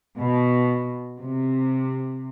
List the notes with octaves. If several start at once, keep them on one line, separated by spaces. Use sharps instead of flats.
B2
C3